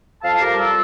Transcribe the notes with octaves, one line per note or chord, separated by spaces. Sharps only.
F2 F5 A5
G4 A#4
G3
F4 A4